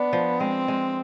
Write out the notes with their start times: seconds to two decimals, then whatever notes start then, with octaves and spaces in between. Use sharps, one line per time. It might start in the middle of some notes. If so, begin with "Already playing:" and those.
Already playing: B3 D4
0.13 F3
0.40 G#3 C4
0.68 G#3